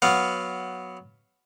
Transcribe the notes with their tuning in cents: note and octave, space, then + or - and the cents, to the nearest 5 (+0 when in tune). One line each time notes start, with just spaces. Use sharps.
F#3 +0 B3 +0 F5 +0